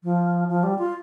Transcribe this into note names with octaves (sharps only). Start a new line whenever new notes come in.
F3
F3
G3
F4